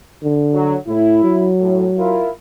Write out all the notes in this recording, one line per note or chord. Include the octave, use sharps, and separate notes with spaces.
D3
F#3
A2 E4
F#3
A2
E4 F4 A#4